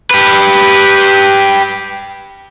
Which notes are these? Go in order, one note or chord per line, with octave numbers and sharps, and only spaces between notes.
G4 B4